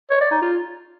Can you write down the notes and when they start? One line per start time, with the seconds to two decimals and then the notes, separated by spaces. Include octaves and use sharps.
0.11 C#5
0.21 D5
0.31 D#4
0.42 F4